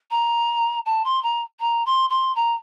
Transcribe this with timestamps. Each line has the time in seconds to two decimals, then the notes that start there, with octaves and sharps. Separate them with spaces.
0.11 A#5
0.86 A5
1.05 C6
1.23 A#5
1.60 A#5
1.86 C6
2.10 C6
2.36 A#5